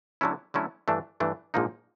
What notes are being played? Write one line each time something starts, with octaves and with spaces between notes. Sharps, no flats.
D3 F#3 A3 C#4 E4
D3 F#3 A3 C#4 E4
G2 E3 A3 D4
G2 E3 A3 D4
A#1 G#2 F3 A#3 D#4